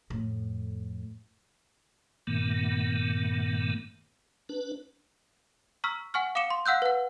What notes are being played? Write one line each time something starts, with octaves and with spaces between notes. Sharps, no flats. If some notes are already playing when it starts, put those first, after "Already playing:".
F2 A2
G2 A#2 D#3 A3 B3
D4 B4
A#5 C#6 E6 F6 B6
F#5 G#5 C#6 F6
F5 D6 D#6 C#7 E7 G7
C6
F5 F#5 E6 F#6 G6
B4 F#5